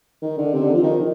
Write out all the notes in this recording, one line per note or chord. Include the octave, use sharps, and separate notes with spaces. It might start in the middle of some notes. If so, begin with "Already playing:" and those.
D#3
D3
C3
D3
F3
D#3